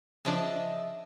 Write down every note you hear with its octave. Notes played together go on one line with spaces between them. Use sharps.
C#3 F3 D4 D#5 E5